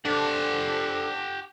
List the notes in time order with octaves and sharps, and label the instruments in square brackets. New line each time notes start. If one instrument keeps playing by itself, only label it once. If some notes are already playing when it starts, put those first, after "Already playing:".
[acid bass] D4 [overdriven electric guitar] G4 F#5 [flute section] A4 C5 D6